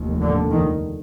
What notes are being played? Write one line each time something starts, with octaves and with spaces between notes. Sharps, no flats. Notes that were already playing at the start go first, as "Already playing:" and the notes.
Already playing: F1 D#2
D3
D#3